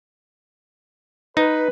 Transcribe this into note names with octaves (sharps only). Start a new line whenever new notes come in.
D#4 B4